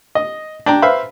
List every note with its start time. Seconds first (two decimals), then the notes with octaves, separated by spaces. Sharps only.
0.15 D#5
0.66 D4 G5 A#5
0.82 B4 C5 E5 F5 B5